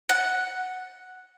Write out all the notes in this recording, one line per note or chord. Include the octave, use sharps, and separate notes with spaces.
F#5